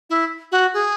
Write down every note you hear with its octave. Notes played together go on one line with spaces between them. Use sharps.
E4
F#4
G#4